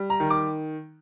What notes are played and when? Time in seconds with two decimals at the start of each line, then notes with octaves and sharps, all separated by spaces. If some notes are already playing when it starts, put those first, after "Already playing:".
Already playing: G3
0.10 A#5
0.20 D#3
0.30 D6